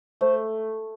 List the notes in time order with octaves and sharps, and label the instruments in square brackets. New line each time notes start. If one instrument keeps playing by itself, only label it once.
[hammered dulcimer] A3 [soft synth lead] C5